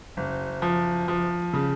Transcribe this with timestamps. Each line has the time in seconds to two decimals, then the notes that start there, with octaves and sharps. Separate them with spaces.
0.17 F#1
0.62 F3
1.08 F3
1.53 C#3